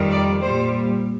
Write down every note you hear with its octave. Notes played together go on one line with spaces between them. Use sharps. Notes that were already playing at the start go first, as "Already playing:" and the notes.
Already playing: F2 D#3 G3
D5
A#2 G3 C5